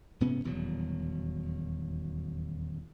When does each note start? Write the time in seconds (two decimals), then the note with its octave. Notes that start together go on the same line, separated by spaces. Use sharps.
0.20 G#2 C3 B3 C#4
0.44 D#1 E2 B2 F#3